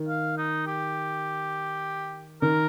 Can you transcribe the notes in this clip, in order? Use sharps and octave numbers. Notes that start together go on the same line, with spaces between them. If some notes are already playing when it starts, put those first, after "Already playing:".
Already playing: D#3
F5
D#4
G4
D#3 A#4